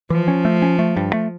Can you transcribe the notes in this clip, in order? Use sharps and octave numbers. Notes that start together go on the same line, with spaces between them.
E3 F3
C#4
A3
C#4
A3
G2
A3